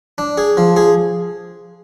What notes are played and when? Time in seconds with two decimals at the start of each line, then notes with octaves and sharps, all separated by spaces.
0.18 D4
0.37 G#4
0.57 F3
0.76 G#4